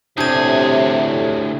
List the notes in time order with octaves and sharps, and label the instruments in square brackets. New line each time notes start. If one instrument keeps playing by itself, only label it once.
[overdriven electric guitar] D2 G#4 [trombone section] A2 [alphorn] C3 [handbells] D4 G4 G#6